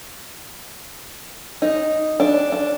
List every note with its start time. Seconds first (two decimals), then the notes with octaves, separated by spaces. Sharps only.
1.62 D#4
2.20 D4
2.52 D4